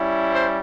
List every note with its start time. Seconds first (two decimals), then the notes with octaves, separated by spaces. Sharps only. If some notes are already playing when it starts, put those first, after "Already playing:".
Already playing: G3 C#4 E4
0.32 C5